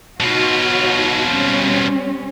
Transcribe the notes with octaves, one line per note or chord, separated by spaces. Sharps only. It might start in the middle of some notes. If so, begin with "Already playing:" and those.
B2 D#4 F4 F#4 C#5
G3 C4 C#4